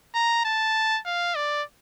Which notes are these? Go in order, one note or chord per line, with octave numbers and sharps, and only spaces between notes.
A#5
A5
F5
D5